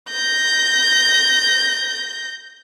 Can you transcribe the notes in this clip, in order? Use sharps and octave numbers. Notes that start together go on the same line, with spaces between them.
G6 A#6